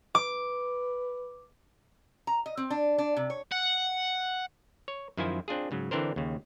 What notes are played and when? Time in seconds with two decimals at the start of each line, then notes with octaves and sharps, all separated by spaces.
0.15 B4 D6
2.27 A#5
2.46 D#5
2.57 C4
2.71 D4
2.98 D4
3.17 C3
3.30 C#5
3.52 F#5
4.88 C#5
5.17 F#2 D#3 F3 E4 C5 G#5
5.48 C4 D4 F4 G#4
5.71 G#2 C#3 F#3
5.91 D3 E3 C4 D4 A#4 C5
6.16 D#2 C#3